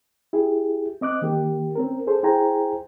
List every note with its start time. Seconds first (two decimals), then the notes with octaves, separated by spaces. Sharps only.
0.33 E4 G4 G#4
1.01 C4 D#5 D6 F#6
1.22 D#3 A#3 G4
1.75 C4 C#4 A#4
2.07 G#4 A4 C5
2.23 E4 G#4 C5 G5 G#5 A#5